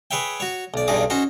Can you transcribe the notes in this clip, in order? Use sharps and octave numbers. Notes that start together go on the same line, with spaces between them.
G#4 B4 C#5 E5 G5
F#4 C#5
B1 D5
B1 E2 G2 D#4 G#4 D6
C#4 D#4 F#4 C5